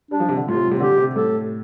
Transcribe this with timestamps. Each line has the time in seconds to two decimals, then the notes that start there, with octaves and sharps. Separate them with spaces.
0.11 G3 D4
0.20 F3
0.29 C3
0.37 D3
0.46 A2 F4
0.54 C3
0.67 A2
0.71 C3
0.80 D3 G4
0.98 C3
1.15 A2 A4